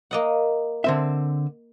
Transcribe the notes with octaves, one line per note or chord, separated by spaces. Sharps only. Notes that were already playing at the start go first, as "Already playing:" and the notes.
A#3 D#5 F#5
D3 C4 E5